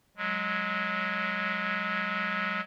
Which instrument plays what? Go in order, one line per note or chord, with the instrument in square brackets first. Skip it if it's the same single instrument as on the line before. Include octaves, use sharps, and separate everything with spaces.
[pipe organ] F#3 G#3